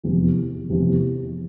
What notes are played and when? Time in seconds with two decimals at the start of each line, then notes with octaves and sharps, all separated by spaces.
0.03 F1 E2 C3
0.69 F1 E2 C3